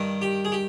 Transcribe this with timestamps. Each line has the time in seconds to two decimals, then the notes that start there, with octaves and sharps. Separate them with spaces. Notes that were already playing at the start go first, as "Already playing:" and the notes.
Already playing: G2 D#3
0.22 G4
0.45 G#4
0.52 G4